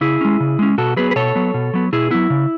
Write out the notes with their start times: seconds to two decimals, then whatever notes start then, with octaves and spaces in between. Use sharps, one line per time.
0.01 C#3 E4 G#4
0.21 G#3 C#4
0.40 C#3
0.59 G#3 C#4
0.78 B2 F#4 A4
0.97 F#3 B3 G#4 B4
1.11 B4
1.16 B2 A4 C#5
1.35 F#3 B3
1.54 B2
1.74 F#3 B3
1.92 B2 E4 G#4
2.11 F#3 B3 E4
2.30 C#3